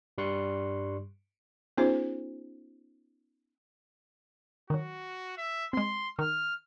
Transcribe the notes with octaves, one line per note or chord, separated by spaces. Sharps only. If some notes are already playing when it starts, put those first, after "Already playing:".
G2 G3 C6 C#6 F#6
B3 C#4 D#4 F4 G#4 C5
D#3 F#3 F#4
E5
G#3 C4 C6
D#3 F6